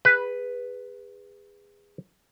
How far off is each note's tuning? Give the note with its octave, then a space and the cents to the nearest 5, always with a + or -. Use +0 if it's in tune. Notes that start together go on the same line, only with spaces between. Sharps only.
G#4 -30 B4 +0